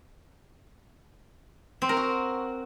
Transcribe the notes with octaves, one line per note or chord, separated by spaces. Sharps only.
C4
A#4
F#4